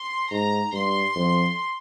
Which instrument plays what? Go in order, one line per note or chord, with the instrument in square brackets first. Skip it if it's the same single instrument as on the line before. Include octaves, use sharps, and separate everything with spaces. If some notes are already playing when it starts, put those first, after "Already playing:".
Already playing: [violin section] C6
[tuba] G#2 [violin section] A#5
[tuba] G2 [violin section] C6
[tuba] F2